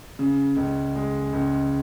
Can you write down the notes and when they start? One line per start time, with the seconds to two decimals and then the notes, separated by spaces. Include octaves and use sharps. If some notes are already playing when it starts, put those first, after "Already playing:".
0.19 C#3
0.57 C#2
0.95 G#3
1.33 C#2